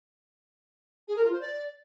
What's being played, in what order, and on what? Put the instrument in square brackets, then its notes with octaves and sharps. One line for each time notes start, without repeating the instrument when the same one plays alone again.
[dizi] G#4
A#4
F4
C5
D5